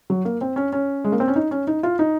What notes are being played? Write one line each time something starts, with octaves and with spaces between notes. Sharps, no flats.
F#3
A#3
C4
C#4
C#4
G#3
A#3
C4
C#4
D#4
C#4
D#4
F4
D#4